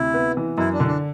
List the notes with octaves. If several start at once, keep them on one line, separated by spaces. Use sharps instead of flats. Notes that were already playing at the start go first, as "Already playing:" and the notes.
Already playing: D2 C3 E4
B3
E3
F#2 E4
D4
D3
D4